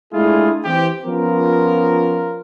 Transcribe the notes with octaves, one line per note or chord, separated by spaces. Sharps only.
G#3 A3 D4 E4 F4 G#4
E3 C4 G4
F3 B3 C#4 F4 A#4